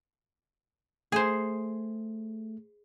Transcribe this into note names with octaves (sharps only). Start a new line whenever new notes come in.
A3 G#4 C5